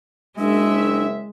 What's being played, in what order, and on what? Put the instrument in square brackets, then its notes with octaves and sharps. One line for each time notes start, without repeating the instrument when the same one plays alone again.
[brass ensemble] F#1 E5 [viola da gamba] G#3 [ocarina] D4